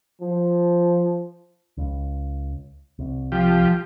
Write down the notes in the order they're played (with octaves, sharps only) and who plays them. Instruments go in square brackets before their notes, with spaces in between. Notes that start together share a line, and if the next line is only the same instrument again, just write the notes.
[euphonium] F3
[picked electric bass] C#2
C2
[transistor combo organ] F3 G4